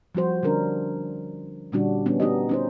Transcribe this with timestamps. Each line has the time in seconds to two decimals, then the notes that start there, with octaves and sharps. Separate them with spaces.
0.15 F3 G3 F#4 C5
0.43 D3 G3 C#4 D4 A#4
1.72 A#2 D3 G3 C#4 D4 F#4
2.06 E3 G3 B3 C#4 D4
2.20 B3 D#4 F#4 G4 D#5
2.49 C#4 D#4 C5